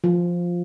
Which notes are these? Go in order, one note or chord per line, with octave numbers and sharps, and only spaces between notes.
F3